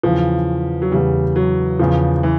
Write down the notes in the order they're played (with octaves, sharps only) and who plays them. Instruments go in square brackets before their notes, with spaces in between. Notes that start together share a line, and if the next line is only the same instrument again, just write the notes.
[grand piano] E2 C#3 E3 [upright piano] F3
[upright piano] F#3
[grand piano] E2 C#3 E3 [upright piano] G3
[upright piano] F#3
[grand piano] E2 C#3 E3 [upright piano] F3
[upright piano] E3